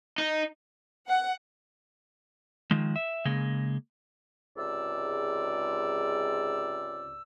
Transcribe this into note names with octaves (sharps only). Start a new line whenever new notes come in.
D#4
F#5
D#3 F3 G#3
E5
C#3 G#3 A#3
C#2 G#2 C3 D5 E6